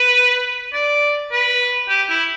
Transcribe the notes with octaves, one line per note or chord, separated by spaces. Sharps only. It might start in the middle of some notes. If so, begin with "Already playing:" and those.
Already playing: B4
D5
B4
G4
E4